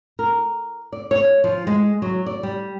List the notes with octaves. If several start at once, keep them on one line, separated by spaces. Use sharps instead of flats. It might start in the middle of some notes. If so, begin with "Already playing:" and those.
A#4
D5
C#5
F3
G#3
F#3
D5
G3